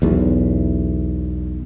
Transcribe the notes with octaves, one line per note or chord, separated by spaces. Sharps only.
B1 E2